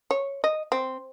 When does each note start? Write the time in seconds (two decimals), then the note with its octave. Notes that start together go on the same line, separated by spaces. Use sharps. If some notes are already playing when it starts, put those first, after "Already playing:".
0.11 C#5
0.44 D#5
0.72 C4